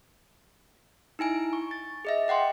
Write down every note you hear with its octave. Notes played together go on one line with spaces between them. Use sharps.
D#4 E4 G#5 D7
C#6
A6
G#4 D#5 E5
D#5 F#5 G5 C6